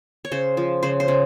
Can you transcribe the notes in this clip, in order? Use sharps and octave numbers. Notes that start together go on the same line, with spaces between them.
C#5
C#3 C5
F3
C#3 C5
C5
C#3